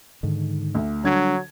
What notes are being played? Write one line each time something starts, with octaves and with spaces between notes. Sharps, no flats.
G#2 D3 D#3
D2
D3 F#3 G3 D4 G#6